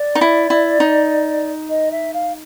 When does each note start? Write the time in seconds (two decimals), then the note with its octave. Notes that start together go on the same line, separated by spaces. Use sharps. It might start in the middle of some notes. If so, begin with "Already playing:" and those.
Already playing: D5
0.15 D#4
0.21 E4
0.50 E4
0.80 D#4
1.69 D#5
1.91 E5
2.13 F5